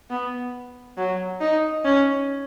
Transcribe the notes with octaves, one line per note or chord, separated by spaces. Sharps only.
B3
F#3
D#4
C#4